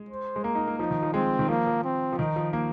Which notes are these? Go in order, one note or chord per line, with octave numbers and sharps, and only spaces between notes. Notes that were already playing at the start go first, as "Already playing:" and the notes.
Already playing: G#3
C5
G#3
A#3 A#4
D#4
A#3
F3 D#4
D#3
F3
G#3 C4
D#3
F3 A#3
F3
C4
F3
D#3 D#4
F3
A#3